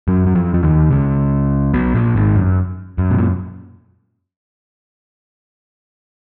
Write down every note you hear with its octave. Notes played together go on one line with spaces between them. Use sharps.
F#2 F#3
F#3
F2 F3
F3
D#2 D#3
C#2 C#3
B1 B2
A#1 A#2
G#1 G#2
F#2
F#2
B2
A#2